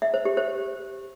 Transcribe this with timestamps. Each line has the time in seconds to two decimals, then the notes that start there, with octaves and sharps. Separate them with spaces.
0.02 E5
0.14 C5
0.25 G4
0.37 C5